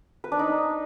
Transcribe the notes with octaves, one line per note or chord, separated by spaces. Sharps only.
B4
D4
D#4